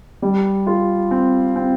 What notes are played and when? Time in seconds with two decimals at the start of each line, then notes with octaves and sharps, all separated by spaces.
0.22 G3
0.67 F4
1.11 C4
1.56 C4